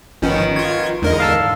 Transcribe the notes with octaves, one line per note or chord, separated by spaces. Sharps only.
G1 D#3 F3 B3 C#4
F4 C#6 G#6
E2 G#2 D3 A#4 D#5
F5 A5 E6